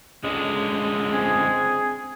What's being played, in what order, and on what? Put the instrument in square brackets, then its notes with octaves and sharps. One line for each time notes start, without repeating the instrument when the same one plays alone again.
[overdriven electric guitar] C#2 D3 [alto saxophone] G#3
[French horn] C4 [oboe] G#4